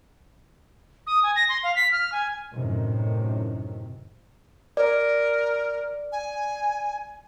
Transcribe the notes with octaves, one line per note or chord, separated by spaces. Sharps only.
D#6
G#5
A#6
C6
F5
B6
F6
G#5
F#2 A2 C3 D#3
A#4 D5
G#5